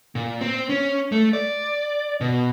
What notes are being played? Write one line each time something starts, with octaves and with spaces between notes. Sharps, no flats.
A#2
C4
C#4
A3
D5
B2